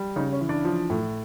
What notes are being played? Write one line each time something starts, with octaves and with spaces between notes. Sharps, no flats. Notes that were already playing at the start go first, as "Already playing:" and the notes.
Already playing: G3
C#3 D#4
C#4
E3
D4
F3
A2